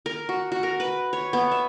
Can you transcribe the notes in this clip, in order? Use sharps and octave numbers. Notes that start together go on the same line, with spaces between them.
A#4
F#4
F#4
A#4
B4
C#5
B3
E5